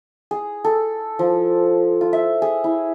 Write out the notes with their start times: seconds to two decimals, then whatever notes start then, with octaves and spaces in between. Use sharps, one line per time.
0.31 G#4
0.64 A4
1.19 F3
2.01 F4
2.13 E5
2.42 G#4
2.64 E4